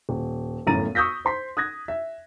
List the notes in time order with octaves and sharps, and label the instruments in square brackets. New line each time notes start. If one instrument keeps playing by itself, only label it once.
[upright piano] D#1
G1 F#2 A2 A#5 A6 D#7
C#6 D#6 E6 G6 A#6 B6
C5 C6 B6
D#6 F#6 G#6 A#6
E5